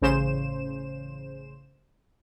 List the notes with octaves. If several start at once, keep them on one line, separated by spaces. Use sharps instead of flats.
A1 C#3 C5 E7